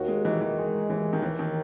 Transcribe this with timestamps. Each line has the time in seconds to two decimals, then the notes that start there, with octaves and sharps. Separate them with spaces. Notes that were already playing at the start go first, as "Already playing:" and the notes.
Already playing: D#2 F#4
0.08 G#3
0.25 D#3 E3
0.41 E3
0.58 G#3
0.90 D#2 E3
1.13 D#3
1.22 D#2 E3
1.39 D#3